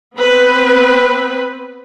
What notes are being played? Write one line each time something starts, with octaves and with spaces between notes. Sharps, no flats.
B3 C4 B4